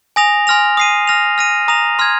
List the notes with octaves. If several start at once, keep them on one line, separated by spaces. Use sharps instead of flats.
G#5 D#6 A#6 F7
G#5 C6 F6 A#6 F7
D#6 C7 D#7
F6 A#6 F7
F6 A#6 D#7
A#5 D#6 A#6 F7
C6 F6 G#6